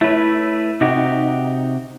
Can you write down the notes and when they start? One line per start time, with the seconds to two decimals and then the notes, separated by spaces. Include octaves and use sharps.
0.01 A3 E4 B4 C#5
0.81 C3 D#4 F#4 G4